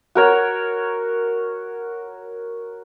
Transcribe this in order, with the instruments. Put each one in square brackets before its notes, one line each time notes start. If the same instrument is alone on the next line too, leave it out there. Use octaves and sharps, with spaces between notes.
[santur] F#4 A#4 C#5